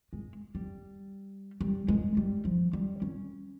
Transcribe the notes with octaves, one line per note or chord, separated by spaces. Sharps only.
G#3
G3
G3
G#3
G3
F3
G3
C#4